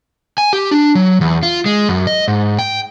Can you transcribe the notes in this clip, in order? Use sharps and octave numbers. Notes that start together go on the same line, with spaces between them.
G#5
G4
D4
F#3
E2
F4
G#3
F#2
D#5
G#2
G5